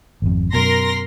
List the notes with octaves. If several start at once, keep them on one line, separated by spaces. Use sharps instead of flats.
G#1 F2
F#2 B2 A#4 C6 A#6